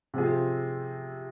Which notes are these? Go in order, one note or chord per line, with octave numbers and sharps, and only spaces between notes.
C3 F3 C4 F4 G#4